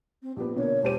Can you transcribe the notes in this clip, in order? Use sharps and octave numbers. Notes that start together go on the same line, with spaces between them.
C4
A#1 B3 G4
B2 D3 A#3 C#5
E1 G4 C5 D#7